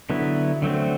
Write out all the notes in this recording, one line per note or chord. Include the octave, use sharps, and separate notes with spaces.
D3 F#3 B3 E4
D3 F#3 A3 C4